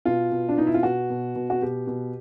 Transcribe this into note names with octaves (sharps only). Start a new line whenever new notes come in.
B2 F4
B2
D4
B2 D#4
E4
F4
B2 F#4
B2
B2
F#4
B2 G4
B2